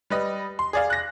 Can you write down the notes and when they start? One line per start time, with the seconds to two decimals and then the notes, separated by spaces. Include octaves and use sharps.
0.10 G3 B4 D#5
0.59 C6
0.73 G#4 D5 F5
0.90 F#6 A#6